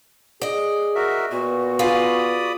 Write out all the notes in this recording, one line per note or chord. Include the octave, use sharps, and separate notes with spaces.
G#4 D5 D#5
F#4 A#4 E5
A#2 B3 F#4
F4 G#4 D5 B5 D#6